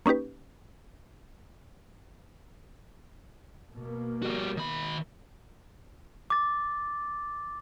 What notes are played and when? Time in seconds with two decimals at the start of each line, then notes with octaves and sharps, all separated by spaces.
0.06 A#3 C#4 D#4 G4 B4
3.76 B2 A#3
4.23 G3 F#4
4.57 D#3 B5
6.30 D6 A6